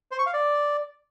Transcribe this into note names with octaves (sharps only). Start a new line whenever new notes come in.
C5
C#6
F5
D5